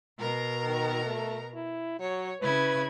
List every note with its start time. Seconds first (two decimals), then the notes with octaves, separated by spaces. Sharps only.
0.18 B2 A#4 A#5
0.65 D#3
1.05 A3
1.54 E4
2.00 F#3 C#5
2.41 C#3 E4 B4 G#6